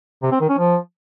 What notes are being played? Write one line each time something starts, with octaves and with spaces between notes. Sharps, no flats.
C3
C4
D#3
C#4
F3